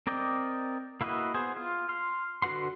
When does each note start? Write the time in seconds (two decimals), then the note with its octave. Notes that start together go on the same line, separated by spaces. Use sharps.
0.07 C4 A#4 D5 D#5 G5
1.01 A#3 E4 F#4 B4 D#5
1.34 B3 G#4 C5
1.56 F4
1.89 C6 F6
2.42 D3 F#4 B4 F#5 C6